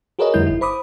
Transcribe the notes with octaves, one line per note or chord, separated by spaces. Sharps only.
F#4 G#4 A#4 B4 C#5 D#5
F2 D3 G3 A3 E4 G6
G1 E4
C5 B5 D6 D#6